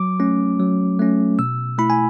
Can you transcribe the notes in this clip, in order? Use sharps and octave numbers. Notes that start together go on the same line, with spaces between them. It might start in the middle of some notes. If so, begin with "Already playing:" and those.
Already playing: F#3 D6
A3 C#4
F#3
A3 C#4
B2 E6
A3 E4 B5
G#5